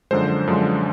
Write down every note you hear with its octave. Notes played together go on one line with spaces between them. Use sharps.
F#2 D3 F3 G#3 C5
F#2 D3 F3 G#3